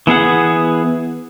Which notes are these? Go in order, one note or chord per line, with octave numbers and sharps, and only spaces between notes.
E3 B3 G#4 F#5